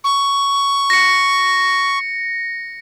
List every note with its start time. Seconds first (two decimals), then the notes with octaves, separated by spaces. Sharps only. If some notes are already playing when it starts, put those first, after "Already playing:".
0.04 C#6
0.90 A#6 C#7